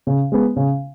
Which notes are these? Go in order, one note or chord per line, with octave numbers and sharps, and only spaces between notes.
C#3
G#3 B3
C#3